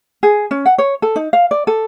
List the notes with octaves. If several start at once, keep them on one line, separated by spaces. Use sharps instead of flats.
G#4
C#4
F#5
C#5
A4
D#4
F5
D5
A4